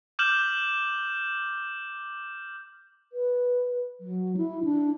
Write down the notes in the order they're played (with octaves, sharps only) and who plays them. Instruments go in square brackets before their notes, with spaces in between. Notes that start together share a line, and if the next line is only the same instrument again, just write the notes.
[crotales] D6 F6 G6 E7 F#7
[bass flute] B4
F#3
E4
D4